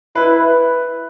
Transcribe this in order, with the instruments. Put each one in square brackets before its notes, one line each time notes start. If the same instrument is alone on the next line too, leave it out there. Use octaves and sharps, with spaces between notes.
[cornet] E4 [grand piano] B4
[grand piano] B4